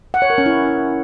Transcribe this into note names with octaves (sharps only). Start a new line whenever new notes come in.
F#5
C#5
A#4
C#4
E4